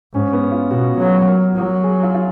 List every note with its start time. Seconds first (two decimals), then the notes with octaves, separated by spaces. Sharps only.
0.14 G#2 C#4
0.33 B3
0.52 F4
0.71 B2 F#4
0.99 F#3 G#4
1.27 A#4
1.55 F#3
1.83 G#4
2.03 F4
2.14 F4